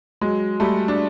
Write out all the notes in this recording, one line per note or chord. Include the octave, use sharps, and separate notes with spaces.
F#3 G#3
G3 A3
D4